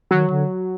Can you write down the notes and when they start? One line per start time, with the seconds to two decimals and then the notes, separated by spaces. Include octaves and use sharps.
0.11 D#3 F#3
0.30 D3